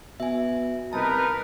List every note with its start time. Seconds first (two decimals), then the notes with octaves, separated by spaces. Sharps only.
0.20 B2 E5 G#5
0.93 C2 D#4 A#4 B4 A5